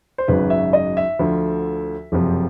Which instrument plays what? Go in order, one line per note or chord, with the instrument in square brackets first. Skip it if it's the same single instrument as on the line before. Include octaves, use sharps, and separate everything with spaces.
[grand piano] C5
G#1 F#2 C#3 B4
E5
D#5
E5
D2 D3 F3
F#1 F2 C3 F3